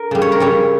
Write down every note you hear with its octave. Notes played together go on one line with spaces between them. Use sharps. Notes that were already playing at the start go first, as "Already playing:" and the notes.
Already playing: A#4
C#3 G3
C#5
A#4
C#3 G3 C#5